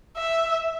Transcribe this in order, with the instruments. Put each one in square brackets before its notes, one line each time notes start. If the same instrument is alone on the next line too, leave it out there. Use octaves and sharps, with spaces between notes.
[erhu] E5